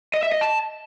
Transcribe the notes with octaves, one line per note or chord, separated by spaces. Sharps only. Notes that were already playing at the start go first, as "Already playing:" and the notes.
D#5
E5
D#5
A5